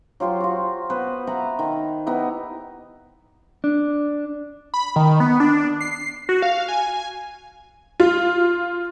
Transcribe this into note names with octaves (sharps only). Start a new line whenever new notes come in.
F#3 F4 G4 C5
F4 F#4
B3 B4 C5
B4 E5 F#5 A#5
D#3
B3 D#4 E4 G4
D4
B5
D#3
B3
D4
C7
F#4
F5
G#5
F4